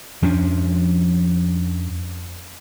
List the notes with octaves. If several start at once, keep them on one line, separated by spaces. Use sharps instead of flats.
F2 F3 C#4 D4